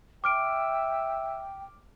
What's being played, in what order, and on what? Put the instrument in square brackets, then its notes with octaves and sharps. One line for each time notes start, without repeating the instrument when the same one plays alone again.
[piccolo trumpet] E5 [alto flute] G5 [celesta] D6 F6 D7